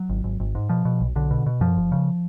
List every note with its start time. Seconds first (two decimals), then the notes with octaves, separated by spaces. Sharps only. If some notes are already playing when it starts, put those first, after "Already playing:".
Already playing: F#3
0.09 G#1
0.24 G#1
0.40 G#1
0.55 G#2
0.69 B2 F3
0.85 B2
1.01 B1
1.16 B1 D3
1.31 B2
1.46 B2
1.61 F#2 F3
1.77 F#1
1.92 C#3